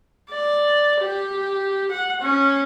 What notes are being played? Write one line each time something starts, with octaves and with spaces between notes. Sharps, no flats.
D5
G4
F#5
C#4